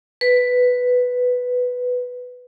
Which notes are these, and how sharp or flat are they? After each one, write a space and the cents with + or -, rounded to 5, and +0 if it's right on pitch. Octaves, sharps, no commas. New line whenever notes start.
B4 +5